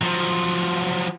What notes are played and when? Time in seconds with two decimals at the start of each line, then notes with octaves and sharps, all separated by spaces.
0.01 F3 F#3